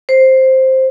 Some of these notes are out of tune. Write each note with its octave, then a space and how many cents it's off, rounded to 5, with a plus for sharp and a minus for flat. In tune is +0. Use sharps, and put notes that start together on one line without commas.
C5 +5